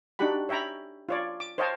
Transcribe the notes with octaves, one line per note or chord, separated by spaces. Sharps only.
D4 D#4 F#4 G4 F#5 B5
C#5 E5 G5 A#5 B5
F4 C#5 D5
D6
C5 C#5 D#5 F5 G5 A5